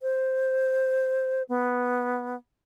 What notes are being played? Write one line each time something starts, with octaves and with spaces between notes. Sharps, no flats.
C5
B3